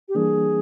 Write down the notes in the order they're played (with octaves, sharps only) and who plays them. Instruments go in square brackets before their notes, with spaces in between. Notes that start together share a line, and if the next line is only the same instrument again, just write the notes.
[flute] G4
[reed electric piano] E3 G3 A#3 D4 [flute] G#4